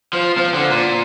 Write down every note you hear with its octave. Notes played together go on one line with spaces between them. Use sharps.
F3
F3
D3
A#2